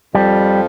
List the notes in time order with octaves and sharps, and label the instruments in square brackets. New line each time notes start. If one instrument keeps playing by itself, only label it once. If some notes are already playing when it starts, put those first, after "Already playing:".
[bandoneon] F2 F3 [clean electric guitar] G3